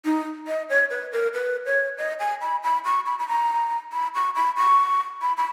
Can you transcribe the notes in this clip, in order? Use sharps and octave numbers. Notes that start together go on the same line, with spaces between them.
D#4
D#5
C#5
B4
A#4
B4
C#5
D#5
G#5
B5
B5
C#6
B5
B5
A#5
B5
C#6
B5
C#6
B5
B5